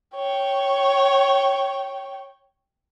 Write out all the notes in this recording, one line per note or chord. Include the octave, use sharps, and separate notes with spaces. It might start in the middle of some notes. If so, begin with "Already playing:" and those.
C#5 G5